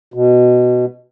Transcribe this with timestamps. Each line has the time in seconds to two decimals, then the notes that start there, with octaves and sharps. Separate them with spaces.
0.14 B2